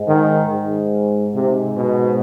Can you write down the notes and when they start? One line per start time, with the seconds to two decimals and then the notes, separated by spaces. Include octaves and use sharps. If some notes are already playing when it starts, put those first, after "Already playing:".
Already playing: G#2
0.08 D#3
0.50 G#2
1.35 G#2 C3
1.77 B2